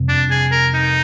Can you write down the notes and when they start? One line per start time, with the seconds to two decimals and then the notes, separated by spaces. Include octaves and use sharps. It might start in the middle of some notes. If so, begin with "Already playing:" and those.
Already playing: F2 C3 G3
0.09 D4
0.31 G#4
0.52 A#4
0.74 D#4